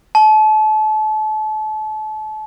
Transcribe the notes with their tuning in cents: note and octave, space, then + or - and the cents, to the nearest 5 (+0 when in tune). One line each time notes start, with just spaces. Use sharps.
A5 -35